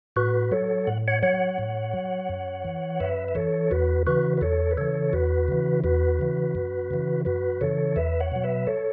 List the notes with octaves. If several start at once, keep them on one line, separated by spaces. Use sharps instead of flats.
A2 F#4 B4
F#3 A4 C#5
A2 F#5
C#5 F#5
F#3 C#5 F#5
A2
F#3
F#2
E3
F#2 B4 E5
E5
E3 A4 C#5
E2 F#4 B4
C#3 E3 F#4 B4
B4
E2 A4 C#5
B4
C#3 E3 A4 C#5
E2 F#4 B4
C#3 E3
E2 F#4 B4
C#3 E3
F#2
C#3 E3
F#2 F#4 B4
C#3 E3 A4 C#5
E2 B4 E5
C#5 F#5
B2 F#3
B4 E5
A4 C#5